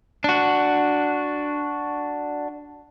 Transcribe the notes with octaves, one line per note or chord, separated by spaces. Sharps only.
D4 F#4